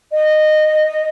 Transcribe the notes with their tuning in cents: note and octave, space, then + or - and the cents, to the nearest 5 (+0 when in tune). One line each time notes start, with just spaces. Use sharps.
D#5 -15